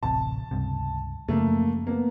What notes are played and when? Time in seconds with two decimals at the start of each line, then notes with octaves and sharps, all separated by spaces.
0.03 D1 A1 C3 A5
0.51 C#2 G2 C3
1.28 F#2 C#3 F3 A3 A#3
1.87 A#3 B3